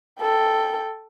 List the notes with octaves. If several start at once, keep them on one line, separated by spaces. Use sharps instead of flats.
A4 G5